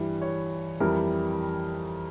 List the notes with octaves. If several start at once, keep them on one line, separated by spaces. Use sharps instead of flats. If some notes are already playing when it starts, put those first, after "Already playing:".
Already playing: G2 E3 G3
C#5
F2 E3 G3 A#4